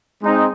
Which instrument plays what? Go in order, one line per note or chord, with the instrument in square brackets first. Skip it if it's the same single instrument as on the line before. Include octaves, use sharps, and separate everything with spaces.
[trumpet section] G#3 C4 D#4